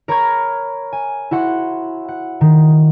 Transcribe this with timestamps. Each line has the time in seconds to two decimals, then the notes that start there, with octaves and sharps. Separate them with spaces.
0.08 A#4 C#5 A#5 B5 C#6 G#6
0.92 G#5
1.31 E4 F#4 F#5 C6
2.08 F#5
2.41 D#3